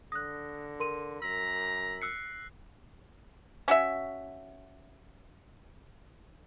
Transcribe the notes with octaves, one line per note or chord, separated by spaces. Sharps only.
D3 D#6 F#6 A#6
A#4 C6 D#7
F#2 A#5 E6 B6
E6 F#6 C7 C#7
C#4 F#4 E5